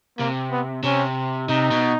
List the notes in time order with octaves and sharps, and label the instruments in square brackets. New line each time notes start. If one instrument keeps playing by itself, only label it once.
[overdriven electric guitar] C3 [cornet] A#3
[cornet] B3
[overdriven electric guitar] C3 [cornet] C#4
[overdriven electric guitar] C3 [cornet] D#4
[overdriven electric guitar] B2